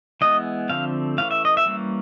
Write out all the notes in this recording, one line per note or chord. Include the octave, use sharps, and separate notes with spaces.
E3 G#3 B3 D#5
D3 F3 A3 C4 F5
E3 A3 C#4 F5
E5
D#5
E5
E3 G3 A#3 C#4